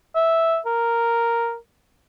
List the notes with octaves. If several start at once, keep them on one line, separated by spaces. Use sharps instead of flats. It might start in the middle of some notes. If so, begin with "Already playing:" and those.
E5
A#4